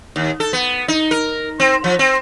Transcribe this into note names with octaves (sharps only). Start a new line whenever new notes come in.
D#2
A4
B3
D#4
A#4
C4
F3
C4